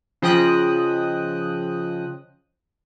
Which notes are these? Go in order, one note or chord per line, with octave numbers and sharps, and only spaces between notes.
C#3 F3 D#5 G5 D#6 F#6